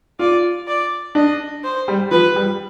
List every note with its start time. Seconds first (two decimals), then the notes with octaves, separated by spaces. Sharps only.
0.19 F4 D5
0.68 D5
1.15 D4 D#5
1.64 C5
1.88 G3
2.11 F3 B4
2.36 G3